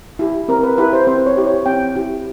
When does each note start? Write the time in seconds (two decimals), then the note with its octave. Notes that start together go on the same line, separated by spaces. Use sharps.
0.19 E4 G4
0.48 C4 A#4
0.63 B4
0.78 E4 G4 B4
0.93 C5
1.07 C4 C5
1.26 C#5
1.37 E4 G4
1.47 C#5
1.66 C4 G5
1.95 E4 G4